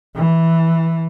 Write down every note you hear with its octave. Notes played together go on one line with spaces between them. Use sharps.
E3